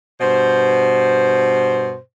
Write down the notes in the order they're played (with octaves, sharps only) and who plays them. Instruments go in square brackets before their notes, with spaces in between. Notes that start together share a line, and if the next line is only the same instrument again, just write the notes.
[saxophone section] G2 B2 C5